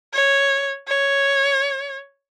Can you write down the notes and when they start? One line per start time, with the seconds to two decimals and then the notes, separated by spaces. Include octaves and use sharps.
0.14 C#5
0.88 C#5